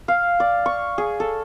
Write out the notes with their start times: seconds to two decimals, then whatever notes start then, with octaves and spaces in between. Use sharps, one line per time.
0.08 F5
0.40 D5
0.66 C#6
0.98 G#4
1.20 A4